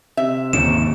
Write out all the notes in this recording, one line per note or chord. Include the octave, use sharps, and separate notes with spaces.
C3 E5
D#2 G#2 C#3 E7